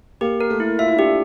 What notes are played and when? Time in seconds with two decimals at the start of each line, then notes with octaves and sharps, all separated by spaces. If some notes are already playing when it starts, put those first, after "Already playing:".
0.21 A#3 G4
0.41 A#4
0.50 A3
0.60 E4
0.79 F4 E5
0.88 E4
0.97 D4 G4
1.05 E4